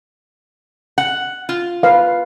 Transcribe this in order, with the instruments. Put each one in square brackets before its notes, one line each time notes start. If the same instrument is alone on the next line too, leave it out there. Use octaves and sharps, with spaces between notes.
[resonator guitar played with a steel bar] F#5
F4
[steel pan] B4 F5